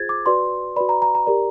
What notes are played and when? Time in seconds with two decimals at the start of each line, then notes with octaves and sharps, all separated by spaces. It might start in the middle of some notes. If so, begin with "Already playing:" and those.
Already playing: F4 G#4 C5 G#6 A6
0.09 D6
0.26 F#4 B4 D5 C6
0.76 F#4 B4 D5 B5
0.89 A#5
1.02 A#5
1.15 A#5
1.27 G4 A#4 D5